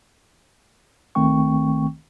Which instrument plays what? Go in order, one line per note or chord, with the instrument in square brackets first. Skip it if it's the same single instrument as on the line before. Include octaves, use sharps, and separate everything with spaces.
[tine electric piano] C2 D#3 A3 C4 G5 C#6